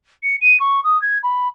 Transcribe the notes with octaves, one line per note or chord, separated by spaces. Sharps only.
C#7
D#7
C#6
D#6
G#6
B5